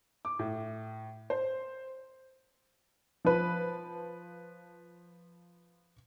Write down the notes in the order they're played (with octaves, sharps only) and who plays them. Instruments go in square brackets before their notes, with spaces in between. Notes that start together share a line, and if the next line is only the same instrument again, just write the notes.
[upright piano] D6
A2
C5
[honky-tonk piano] F3 B4